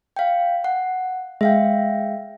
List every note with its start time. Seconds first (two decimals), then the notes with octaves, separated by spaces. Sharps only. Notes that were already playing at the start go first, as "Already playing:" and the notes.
0.17 F5 G5
0.64 F#5
1.41 G#3 E5 F5 G5